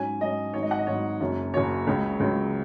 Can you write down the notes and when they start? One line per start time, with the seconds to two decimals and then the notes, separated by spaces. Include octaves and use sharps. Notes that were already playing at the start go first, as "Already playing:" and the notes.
Already playing: G#2 F#3 C#4 G#5
0.20 G#2 F#3 C#4 D#5
0.53 G#1 G#2 F#3 C#5
0.62 D#5
0.71 F#5
0.79 D#5
0.87 G#1 G#2 F#3 C#5
1.20 F#1 F#2 F#3 C#4
1.54 F#1 F#2 F#3 C#4 C#5
1.87 C#2 C#3 F#3
2.20 C#2 C#3 F#3